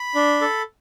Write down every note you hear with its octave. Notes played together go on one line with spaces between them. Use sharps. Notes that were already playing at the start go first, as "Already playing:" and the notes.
Already playing: B5
D4
A4